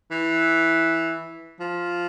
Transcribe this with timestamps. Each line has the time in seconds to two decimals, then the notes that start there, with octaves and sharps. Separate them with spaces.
0.11 E3
1.60 F3